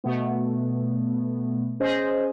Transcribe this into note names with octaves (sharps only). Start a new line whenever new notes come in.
B2 A3 B3
C#4 G#4 C5 D#5